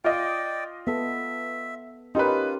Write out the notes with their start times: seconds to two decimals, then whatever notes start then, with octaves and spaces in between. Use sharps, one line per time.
0.04 F4 D5 D#5 G5
0.87 B3 A4 E5
2.15 C#4 D#4 F4 G4 A#4 B4